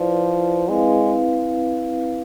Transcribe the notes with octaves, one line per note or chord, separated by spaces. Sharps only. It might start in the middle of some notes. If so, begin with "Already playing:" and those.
Already playing: F3 E4 B4 D5
G#3 C4 E4 B4 F5